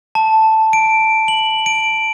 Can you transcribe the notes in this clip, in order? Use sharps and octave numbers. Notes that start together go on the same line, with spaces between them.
A5
D7
F#7
D7